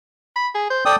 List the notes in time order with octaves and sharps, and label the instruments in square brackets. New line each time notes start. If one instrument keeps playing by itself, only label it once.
[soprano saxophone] B5
G#4
C5
[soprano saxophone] A4 [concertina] D5 G5 D#6